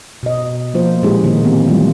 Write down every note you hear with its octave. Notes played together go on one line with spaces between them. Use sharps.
B2 D#5
F3 A#3 F4 C5
A#2 G#3 C#4 E4 G4 G#4
D#3 A#3
E3 B3 C4 G4
F#3 G3 A3 F4